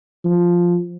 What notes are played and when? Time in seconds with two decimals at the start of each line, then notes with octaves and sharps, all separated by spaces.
0.24 F3